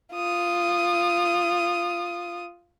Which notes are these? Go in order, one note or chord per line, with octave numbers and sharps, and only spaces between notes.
F4 D#6